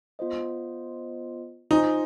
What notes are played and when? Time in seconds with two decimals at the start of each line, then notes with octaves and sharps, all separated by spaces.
0.19 B3 F4 C5 D#5
1.71 D#4 F4 C5 D#5 G#5